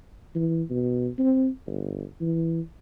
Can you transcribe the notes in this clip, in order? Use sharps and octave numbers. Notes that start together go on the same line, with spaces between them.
E3
B2
C4
G1
E3